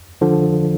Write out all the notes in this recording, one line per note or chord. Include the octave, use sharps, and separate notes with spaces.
D3 F3